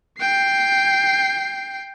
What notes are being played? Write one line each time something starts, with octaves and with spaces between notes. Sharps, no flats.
G5 C7